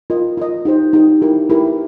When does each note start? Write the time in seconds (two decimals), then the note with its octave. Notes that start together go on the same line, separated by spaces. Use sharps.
0.10 F4 A#4 D#5
0.37 F4 A#4 D#5
0.65 D#4 G4 C5
0.93 D#4 G4 C5
1.22 E4 G4 A#4
1.50 E4 G4 A#4